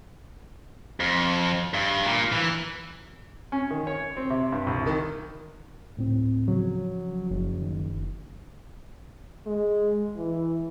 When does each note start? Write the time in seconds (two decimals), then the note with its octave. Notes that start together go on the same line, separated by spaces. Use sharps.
1.00 F2
1.74 G2
2.05 A#2
2.32 E3
3.52 C#4
3.70 D#3
3.87 C#5
4.17 C4
4.30 C3
4.52 G2
4.67 C2
4.86 D#3
5.97 D2 A2 C4
6.48 C#3 F3 F#3
7.31 F#1
7.62 D#3
9.46 G#3
10.17 E3